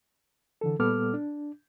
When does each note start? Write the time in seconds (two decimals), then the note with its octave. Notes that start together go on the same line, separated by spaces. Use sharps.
0.61 D3 E3 A4
0.79 A#2 G3 B3 A4 D6 F6
1.14 D4